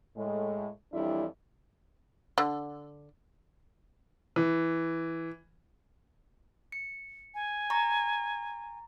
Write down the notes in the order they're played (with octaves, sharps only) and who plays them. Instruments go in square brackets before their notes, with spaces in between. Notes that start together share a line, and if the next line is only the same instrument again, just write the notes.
[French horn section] A2 G#3
F2 E3 G3 D4 E4 C#5
[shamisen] D3
[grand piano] E3
[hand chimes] C#7
[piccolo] G#5
[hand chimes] A#5 C#6 A6